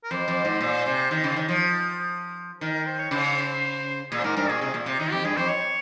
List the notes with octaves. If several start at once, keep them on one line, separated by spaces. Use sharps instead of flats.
A#4
F2 C5
F2
G#2
A#2
C3
D#3
C#3
D#3
F3
D#3 A#4
A#4
C5
C#5
C#3 C5
C#5
C5
A#2 G#4
C5
G#2 A#4
G2 A#4
A#2 G#4
C3 G#4
A#2
C3
D#3 D#4
F2 G4
G2 G#4
F2 C5
C#5